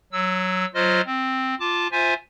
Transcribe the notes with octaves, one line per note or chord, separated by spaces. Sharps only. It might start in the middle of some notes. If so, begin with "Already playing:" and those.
F#3 E6
F#3 F4 C5 D#5 F6
C4
F4 A5 D6
F4 C5 E5 G#5